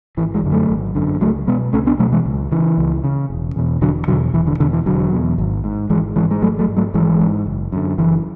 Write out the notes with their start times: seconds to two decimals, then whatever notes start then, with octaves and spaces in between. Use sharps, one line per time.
0.17 G#1 E3
0.35 E3 G#3
0.44 F#2 D3
0.52 F#3 A3
0.70 G#1
0.95 F#2 D3
1.21 C#2 F#3 A3
1.47 B2 G#3 B3
1.73 C#2 A3 C#4
1.87 B3 D4
1.99 B2 F#3 A3
2.12 E3 G#3
2.25 C#2
2.52 C#3 E3
2.78 C#2
3.04 C#3
3.30 E1
3.56 E2 B2
3.81 E1 D3 F#3
4.08 E2 B2 D3 F#3
4.34 E1 E3
4.47 D3
4.60 E2 B2 D3
4.73 E3
4.86 E1 D3 F#3
5.12 E2 B2
5.38 G#1
5.64 G#2
5.90 G#1 E3 G#3
6.16 G#2 E3 G#3
6.31 G#3
6.42 G#1 F#3 A3
6.59 F#3 A3
6.68 G#2
6.77 F#3 A3
6.94 G#1 E3 G#3
7.21 G#2
7.46 F#1
7.72 F#2 D3
7.98 F#1 E3